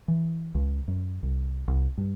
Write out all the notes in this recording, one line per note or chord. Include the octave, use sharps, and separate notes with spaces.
E3
C#2
F#2
C2
C2
G2